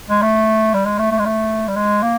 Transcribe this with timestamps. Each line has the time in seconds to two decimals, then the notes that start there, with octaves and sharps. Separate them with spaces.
0.09 G#3
0.22 A3
0.74 G3
0.86 G#3
0.99 A3
1.12 A3
1.19 G#3
1.26 A3
1.68 G3
1.76 G#3
2.02 A#3